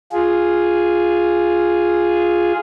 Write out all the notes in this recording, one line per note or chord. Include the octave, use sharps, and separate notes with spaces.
F4 G#4